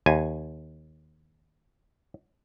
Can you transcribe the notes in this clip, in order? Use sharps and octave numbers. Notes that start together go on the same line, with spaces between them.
D#2 G#5